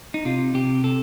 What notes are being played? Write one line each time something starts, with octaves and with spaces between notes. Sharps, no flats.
D#4
C3 F4
C3 G4
C3 A4